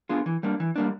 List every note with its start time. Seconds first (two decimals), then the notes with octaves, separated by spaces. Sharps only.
0.09 B3 D4 F4 G#4
0.26 E3
0.43 G3 A#3 D4
0.60 E3
0.76 G3 A#3 D4